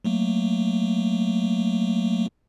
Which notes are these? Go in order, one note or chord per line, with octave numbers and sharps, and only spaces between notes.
F#3 A3 A#3